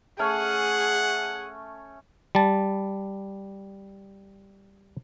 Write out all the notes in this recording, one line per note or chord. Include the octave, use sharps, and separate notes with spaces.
A3 C#4 G#4 C#5 F#5
G3 A5